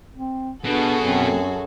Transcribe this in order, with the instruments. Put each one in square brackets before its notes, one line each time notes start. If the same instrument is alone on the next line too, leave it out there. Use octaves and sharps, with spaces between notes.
[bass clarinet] C4
[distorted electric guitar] B2 [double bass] B3 [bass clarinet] D4 [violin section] F#4 G#4 A4
[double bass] F#2 [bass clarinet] C4